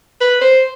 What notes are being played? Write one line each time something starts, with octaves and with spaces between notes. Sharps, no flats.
B4
C5